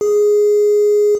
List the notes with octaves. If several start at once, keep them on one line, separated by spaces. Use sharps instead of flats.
G#4